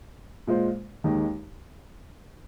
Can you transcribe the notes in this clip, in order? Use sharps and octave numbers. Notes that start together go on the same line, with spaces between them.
A#2 G#3 F4 C5
D#2 D#3 G#3 D#4